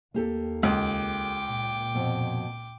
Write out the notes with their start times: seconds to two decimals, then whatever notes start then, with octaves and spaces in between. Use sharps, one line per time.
0.14 D#2 A#3 G4 A4
0.63 C#2 G5 D6
1.46 A#2
1.95 F2 B2